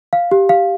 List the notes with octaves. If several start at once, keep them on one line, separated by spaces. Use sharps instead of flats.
F5
G4
F5